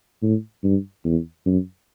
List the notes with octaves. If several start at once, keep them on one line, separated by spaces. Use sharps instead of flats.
A2
G2
E2
F#2